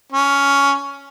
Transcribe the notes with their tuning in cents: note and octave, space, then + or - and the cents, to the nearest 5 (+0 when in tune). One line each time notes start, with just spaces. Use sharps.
C#4 +10